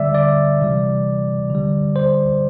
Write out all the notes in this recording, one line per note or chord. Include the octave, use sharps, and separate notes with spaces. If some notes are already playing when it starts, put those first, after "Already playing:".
Already playing: D3 G3 D5 E5
D5
C3 E3 G3
D3 G3
C5